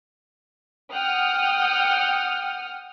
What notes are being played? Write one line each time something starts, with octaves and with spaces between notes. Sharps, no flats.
F#5 G5 D#6 F6